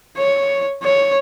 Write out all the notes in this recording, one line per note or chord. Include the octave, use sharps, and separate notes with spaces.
C#5
C#5